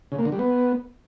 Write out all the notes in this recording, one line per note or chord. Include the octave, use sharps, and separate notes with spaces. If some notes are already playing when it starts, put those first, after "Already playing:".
C#3
A#3
D3
G3
B3